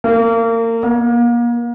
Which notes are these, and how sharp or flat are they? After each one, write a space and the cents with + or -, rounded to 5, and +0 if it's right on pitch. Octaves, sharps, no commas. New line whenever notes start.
A#3 -30
A#3 +35